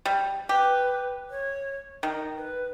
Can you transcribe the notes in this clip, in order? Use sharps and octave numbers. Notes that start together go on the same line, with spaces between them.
G3
G4 B4
C#5
D#3 D#5
B4